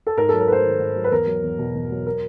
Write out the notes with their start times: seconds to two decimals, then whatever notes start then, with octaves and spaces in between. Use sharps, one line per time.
0.07 A4
0.17 G#2 A#4
0.29 F#3 A4
0.41 A#4
0.48 A3 B4 C5
0.64 D#3
0.79 G#2
0.96 F#3
1.04 B4
1.12 E2 A#4
1.27 F#3
1.43 E2
1.58 B2
1.75 E2
1.91 F#3
2.07 A#4